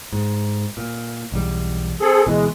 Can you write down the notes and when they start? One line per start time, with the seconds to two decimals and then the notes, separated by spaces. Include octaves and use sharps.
0.13 G#2
0.77 A#2
1.32 B1 E2 G3
2.00 C4 G#4 A4
2.27 D2 B2 E3 G#3